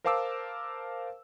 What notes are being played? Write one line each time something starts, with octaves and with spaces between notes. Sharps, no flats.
A#4 C5 F5 A5 D6 E6